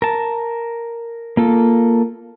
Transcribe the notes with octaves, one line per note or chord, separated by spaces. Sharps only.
A#4 A5
A#3 F4 A4